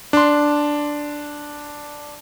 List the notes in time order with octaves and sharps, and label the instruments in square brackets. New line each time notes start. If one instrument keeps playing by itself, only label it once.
[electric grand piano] D4 C6